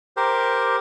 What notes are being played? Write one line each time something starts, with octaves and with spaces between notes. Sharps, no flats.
G4 A#4 C5